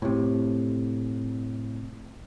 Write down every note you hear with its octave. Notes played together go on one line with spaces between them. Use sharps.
A2 C3